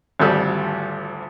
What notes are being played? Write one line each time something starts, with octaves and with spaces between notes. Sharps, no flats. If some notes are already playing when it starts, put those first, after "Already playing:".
G#1 D2 F3 G3 A4 E6